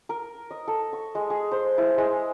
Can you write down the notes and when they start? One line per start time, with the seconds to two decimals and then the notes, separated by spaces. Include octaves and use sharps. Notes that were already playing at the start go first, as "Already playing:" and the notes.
0.09 A#4
0.51 D#5
0.68 A4
0.93 C#6
1.15 G#3
1.30 G#4
1.51 C5
1.78 E4
1.98 G#3